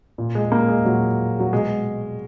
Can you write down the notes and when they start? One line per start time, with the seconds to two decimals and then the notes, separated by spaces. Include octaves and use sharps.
0.18 A#2
0.35 G#3
0.52 A#3
0.69 G#3
0.85 A#2 F#3
1.39 F#3
1.52 B2 G#3